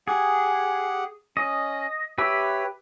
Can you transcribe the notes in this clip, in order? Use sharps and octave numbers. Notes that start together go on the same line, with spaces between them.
G4 G#4 F#5
C#4 D#5
G4 B4 C#5 E5